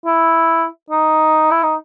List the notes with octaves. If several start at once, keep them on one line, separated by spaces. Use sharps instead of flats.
E4
D#4
E4
D#4